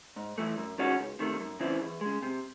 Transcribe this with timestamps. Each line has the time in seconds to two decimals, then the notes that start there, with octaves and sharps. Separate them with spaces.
0.16 G#2
0.38 E3 A3
0.58 F#2
0.78 D#3 G#3 C#4 F#4
0.99 C#2
1.19 C3 D#3 A3
1.40 F#2
1.60 C#3 E3 C4 E4
1.82 E2
2.01 C#3 G#3
2.23 C3